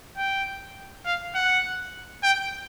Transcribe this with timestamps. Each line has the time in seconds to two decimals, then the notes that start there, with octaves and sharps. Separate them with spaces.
0.17 G5
1.06 F5
1.35 F#5
2.23 G5